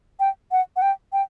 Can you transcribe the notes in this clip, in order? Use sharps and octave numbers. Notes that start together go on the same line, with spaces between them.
G5
F#5
F#5
G5
G5